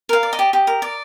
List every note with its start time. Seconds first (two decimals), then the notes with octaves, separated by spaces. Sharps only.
0.09 A#4 F5
0.23 D5
0.33 D#5
0.39 G4
0.53 G4
0.67 A#4
0.82 D5